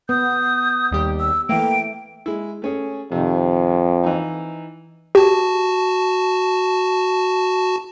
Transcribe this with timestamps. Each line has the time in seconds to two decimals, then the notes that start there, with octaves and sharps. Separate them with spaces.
0.09 B3 D#6 G6
0.91 D#2 G3 G4
1.20 E6
1.49 E3 A3 A#3 G5 D7
2.26 G#3 E4
2.62 A3 C#4 G#4
3.12 F2 C3 D#3
4.03 E3 D#4
5.15 F#4 G4 A5